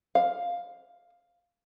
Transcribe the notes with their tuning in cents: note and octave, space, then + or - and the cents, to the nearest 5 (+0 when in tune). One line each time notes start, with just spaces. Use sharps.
F5 +5